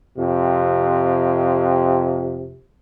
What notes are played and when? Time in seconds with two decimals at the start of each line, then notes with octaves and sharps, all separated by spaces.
0.18 F2 C3